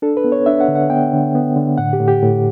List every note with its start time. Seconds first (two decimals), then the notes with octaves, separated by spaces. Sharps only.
0.02 D4 A4
0.17 B4
0.24 B3
0.32 C#5
0.46 D4 E5
0.61 F#5
0.68 D3
0.75 F#5
0.90 B3 G5
1.13 D3
1.35 B3
1.56 D3
1.78 A2 F#5
1.93 G4
2.00 A2
2.08 G4
2.22 A2